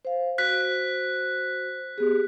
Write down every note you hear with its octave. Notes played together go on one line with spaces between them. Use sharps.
C5 F5
F#4 C5 F#6 B6
B3 G4 G#4